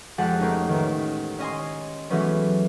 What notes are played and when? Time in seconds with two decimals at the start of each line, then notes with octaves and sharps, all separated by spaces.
0.18 F2 G#3 G4 F#5 A5
0.40 A3 A#3 C#4 D#4
0.69 A1 D#3
1.39 C#4 D#5 G#5 C6
2.10 E3 F#3 G#3 A3 B3 C#4